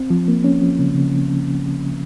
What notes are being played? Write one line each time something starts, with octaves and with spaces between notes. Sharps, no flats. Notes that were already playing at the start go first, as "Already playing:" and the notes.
Already playing: C4
F3
A#3
C#4
F3
C#3
C#3